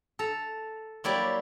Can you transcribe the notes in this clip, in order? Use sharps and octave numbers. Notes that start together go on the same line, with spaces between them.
A4 A#5
F#3 G3 A#3 E4 G4 D5